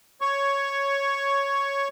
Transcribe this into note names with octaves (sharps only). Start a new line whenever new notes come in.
C#5 C#6